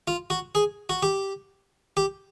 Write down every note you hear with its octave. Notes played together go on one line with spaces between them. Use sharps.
F4
F#4
G#4
F#4
G4
G4